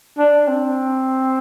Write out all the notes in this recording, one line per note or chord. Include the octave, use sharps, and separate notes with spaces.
D4
C4